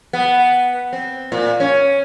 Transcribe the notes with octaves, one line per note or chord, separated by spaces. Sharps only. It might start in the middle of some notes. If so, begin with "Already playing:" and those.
B3
C4
A#2
C#4